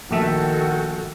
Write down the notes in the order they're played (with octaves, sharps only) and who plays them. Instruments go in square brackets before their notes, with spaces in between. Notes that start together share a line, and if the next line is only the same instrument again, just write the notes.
[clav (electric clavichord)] A#1 A3 E5 [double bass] D#3 [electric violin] F#4 A4 [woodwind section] F#5 G5